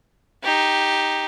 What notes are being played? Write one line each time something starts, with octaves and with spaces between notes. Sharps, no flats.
D#4 G4